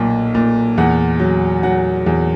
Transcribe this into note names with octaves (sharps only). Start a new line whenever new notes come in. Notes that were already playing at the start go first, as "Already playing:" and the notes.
Already playing: B1 A#2
A#2
E2 F#5
F#3
F#3 F#5
E2